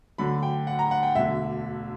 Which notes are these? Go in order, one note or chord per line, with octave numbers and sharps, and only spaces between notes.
D2 D3 F#3 B5
G5
F#5
A#5
F#5
G5
E1 D2 D3 E5